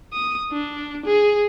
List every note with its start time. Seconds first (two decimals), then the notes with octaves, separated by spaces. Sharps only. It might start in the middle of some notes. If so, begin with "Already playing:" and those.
0.13 D#6
0.52 D4
1.06 G#4